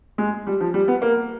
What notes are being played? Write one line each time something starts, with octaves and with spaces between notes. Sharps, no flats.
G#3
G3
F3
G3
B3
A#3